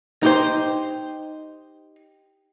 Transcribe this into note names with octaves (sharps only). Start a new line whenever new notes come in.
D#4 G4 C5